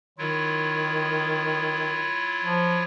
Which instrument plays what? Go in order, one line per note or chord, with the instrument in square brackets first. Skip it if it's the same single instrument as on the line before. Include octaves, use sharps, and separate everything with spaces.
[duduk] D#3 [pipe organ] F#3 E4 F4
[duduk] F3